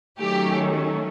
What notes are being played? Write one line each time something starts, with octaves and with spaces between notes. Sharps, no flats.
D#3 F#3 A3 C#4 G4